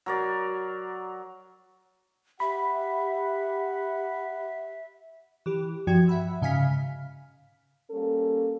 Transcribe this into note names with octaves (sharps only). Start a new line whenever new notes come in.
F#3 A#4 D5
G4 E5 F#5 B5
E3 G4
G2 F3 F#4 G5 G#6
E5 F#5 B5 E6
G#2 C#3 F5 G#5 F6 B6
G3 A#3 C#4 A4